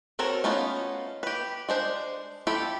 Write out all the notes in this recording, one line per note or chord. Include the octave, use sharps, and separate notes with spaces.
C4 F#4 A4 A#4 C#5
A3 B3 C#4 D#4 F4
G4 B4
G#3 D4 C5
E4 F4 G4 A4 B5